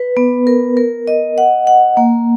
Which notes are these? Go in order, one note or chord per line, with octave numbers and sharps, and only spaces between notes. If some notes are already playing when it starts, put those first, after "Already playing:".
Already playing: B4
B3
A#4
A#4
D#5
F#5
F#5
A#3